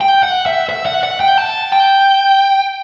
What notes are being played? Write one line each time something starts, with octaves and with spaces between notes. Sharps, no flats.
G5
F#5
E5
E5
F#5
F#5
G5
A5
G5